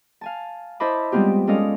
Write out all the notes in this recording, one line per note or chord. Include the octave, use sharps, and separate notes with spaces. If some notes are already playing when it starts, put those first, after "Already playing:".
F5 G#5 A5
E4 C5 D#5 A5 B5 D6
G3 G#3 B3 C4 F4 G4
G#3 C#4 A4 D5 D#5 F5